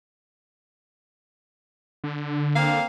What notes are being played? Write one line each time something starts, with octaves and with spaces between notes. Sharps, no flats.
D3
A#3 C4 F5